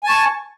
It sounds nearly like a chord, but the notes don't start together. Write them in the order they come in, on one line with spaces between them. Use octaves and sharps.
G#5 A5 C#6